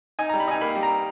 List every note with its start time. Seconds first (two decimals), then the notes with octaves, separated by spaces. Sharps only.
0.19 D#4 G#5
0.29 A#5
0.34 G3
0.40 B5
0.48 D#4 G#5
0.61 A#3 B5
0.76 G3
0.83 A#5